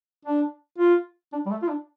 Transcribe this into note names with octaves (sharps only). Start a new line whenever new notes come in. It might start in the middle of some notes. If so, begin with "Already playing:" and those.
D4
F4
D4
G3
A3
F4
D4